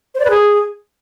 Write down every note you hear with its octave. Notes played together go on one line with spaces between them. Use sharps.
C5
D5
B4
G#4